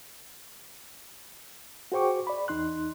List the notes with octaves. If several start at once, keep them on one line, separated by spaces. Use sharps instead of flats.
F#4 G#4 C5 G5 C#6 D6
D5 B5
E2 D#4 C6 F#6